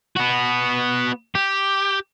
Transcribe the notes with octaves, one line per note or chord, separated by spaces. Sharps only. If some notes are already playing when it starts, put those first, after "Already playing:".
B3 F#4
G4